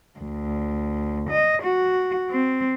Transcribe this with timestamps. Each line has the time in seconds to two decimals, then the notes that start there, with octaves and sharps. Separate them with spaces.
0.20 D2
1.30 D#5
1.63 F#4
2.30 C4